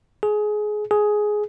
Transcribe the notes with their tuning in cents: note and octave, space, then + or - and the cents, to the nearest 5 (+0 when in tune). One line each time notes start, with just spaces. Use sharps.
G#4 +20
G#4 +10